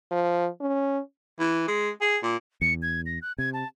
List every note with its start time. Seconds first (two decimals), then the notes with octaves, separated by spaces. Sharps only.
0.11 F3
0.61 C#4
1.40 E3
1.68 G#3
2.01 G#4
2.23 A#2
2.61 E2 C#7
2.82 G#6
3.06 A#6
3.22 F#6
3.38 C3 G#6
3.53 A5